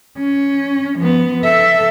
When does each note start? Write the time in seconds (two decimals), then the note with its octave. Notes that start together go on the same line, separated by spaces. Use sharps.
0.18 C#4
0.98 F3 B3
1.43 A4 E5